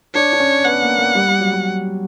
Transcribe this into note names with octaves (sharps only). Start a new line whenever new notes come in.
D4 C#5
D4
C#4
B3 F#5
A#3
A#3
G3
G3
F#3
G3